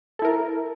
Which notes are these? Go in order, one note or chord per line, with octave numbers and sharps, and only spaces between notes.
E4 A4 A#4